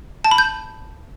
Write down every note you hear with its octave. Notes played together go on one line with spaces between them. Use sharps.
A5
B5
G6